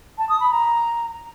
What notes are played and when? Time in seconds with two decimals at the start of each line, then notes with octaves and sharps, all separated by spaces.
0.18 A5
0.29 D#6
0.40 B5
0.51 A#5